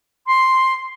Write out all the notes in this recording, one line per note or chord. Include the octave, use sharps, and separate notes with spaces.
C6